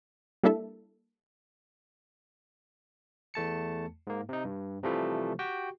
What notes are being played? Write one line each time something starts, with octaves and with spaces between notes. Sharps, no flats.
G3 A#3 D4 E4 A4 E5
E2 A3 A5 C#7
G#2 A#3
C3 D#4
G2
C3 E3 F3 G3 A3
F#4 G4 G5